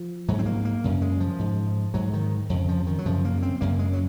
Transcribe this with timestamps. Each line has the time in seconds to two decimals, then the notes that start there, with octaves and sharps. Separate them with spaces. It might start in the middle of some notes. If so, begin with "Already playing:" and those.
Already playing: F3
0.28 G#2 F#3
0.39 C4
0.46 A#3
0.65 A#3
0.84 F#2 C#3
1.02 G#3
1.20 F3
1.39 G#2
1.94 G#2 F#3
2.13 D#3
2.50 F2 C#3
2.69 F3
2.87 D#3
2.98 F#3
3.05 F#2 C#3 F3
3.25 A#3
3.42 C4
3.61 F#2 C#3 A#3
3.79 G#3
3.93 F#3